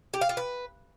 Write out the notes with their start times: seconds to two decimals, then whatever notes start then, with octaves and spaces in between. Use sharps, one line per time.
0.14 G4
0.21 F5
0.29 F4
0.37 B4